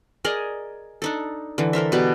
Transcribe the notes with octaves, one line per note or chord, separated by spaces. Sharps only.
G#4 A#4 D5 D#5
D4 D#4 A4
D3 E3
A4 A#4 C5 E5
B2 B3 G4 D5